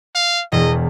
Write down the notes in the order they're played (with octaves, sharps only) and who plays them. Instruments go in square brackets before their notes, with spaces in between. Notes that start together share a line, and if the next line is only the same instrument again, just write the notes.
[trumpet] F5
[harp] E1 E2 [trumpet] D#5